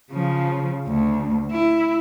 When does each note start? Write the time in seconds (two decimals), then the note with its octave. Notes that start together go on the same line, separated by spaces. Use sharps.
0.12 C#3 F3
0.88 D2
1.51 E4